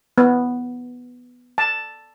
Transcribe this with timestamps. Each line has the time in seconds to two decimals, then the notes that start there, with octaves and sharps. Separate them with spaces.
0.18 B3
1.58 A5